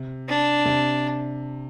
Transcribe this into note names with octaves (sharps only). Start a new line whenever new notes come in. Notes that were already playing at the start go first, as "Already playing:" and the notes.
Already playing: C3
D4
C3